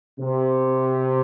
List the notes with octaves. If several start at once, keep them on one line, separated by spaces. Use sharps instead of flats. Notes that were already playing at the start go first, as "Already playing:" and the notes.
C3